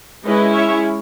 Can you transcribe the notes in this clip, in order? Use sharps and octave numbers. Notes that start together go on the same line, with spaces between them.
G#3 C#4 E4 B4 D#5
C#5 E5